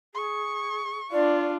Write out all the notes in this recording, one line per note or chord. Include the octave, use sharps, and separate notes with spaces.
G#4 C#6
D4 F4 D5